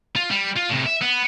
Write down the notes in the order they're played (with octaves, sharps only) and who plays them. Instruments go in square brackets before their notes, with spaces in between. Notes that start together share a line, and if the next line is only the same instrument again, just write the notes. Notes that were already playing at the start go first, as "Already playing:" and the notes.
[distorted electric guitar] F4
G3
F4
A2 C3
E5
B3